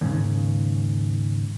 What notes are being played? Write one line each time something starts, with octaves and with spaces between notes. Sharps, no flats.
D#2 G#2 C#3